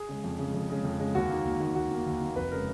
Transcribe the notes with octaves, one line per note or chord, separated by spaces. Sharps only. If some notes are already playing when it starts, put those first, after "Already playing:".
Already playing: G#4
C#3 G#3
F2
C#3 G#3
F2
C#3 G#3
F2
C#3 G#3
D#2 F#4
D#3 A#3
D#2
D#3 A#3
D#2 F#4
D#3 A#3
D#2
D#3 A#3
F1 B4
C#3 G#3 A#4